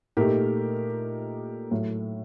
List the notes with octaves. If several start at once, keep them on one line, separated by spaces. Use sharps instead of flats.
A#2 A3 D#4 G4 A#4
A2 F#3 A3